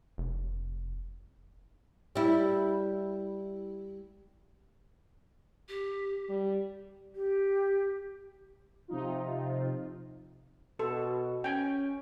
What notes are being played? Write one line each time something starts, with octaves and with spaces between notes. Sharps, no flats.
F1
G3 E4
G4
G3
G4
C3 F3 D#4 F4
B2 A4
C#4 G5 G#5